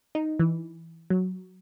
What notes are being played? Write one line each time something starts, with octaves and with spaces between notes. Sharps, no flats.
D#4
E3
F#3